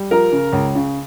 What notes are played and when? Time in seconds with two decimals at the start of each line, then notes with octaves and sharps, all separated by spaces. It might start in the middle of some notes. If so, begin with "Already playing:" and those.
Already playing: G3
0.11 F3 A#4
0.32 C#3
0.53 C#2
0.75 C#3